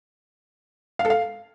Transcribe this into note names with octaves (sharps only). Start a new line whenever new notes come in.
F5
A4
F5